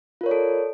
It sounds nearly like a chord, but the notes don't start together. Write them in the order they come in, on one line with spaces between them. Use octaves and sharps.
F4 A#4 C#5 D5 A4